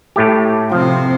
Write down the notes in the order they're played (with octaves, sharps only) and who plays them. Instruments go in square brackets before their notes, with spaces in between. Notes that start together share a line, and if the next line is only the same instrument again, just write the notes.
[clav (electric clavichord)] A2 A3 G4
[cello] C3 C4 [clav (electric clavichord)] F3